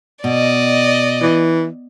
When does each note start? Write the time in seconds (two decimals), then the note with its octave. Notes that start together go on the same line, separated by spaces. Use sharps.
0.24 B2 D5 D#5
1.22 E3